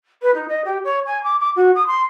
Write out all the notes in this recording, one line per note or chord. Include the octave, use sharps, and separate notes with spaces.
B4
D#4
D#5
G4
C#5
G#5
D6
D6
F#4
D#6
C6